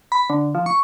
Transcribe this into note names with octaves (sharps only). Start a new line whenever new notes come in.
B5
D3
F3
C#6